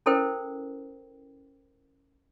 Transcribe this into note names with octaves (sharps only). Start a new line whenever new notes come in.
C#4 E4 A4 A#4 C5 G5